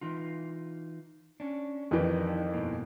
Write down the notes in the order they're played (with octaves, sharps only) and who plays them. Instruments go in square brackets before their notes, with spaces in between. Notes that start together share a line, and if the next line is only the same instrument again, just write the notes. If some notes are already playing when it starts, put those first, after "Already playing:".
[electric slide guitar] E3 D#4 F4
C#4 D4
[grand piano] F2 D#3 E3 [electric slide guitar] D4 D#4 G4
[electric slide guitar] G2 B2 A#3